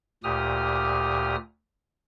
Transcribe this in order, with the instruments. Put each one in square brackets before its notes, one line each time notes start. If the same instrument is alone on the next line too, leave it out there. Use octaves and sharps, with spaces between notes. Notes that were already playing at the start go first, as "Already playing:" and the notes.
[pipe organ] D2 A#2 G4 D#6 F6